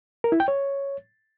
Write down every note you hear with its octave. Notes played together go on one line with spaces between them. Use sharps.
A#4
E4
G5
C#5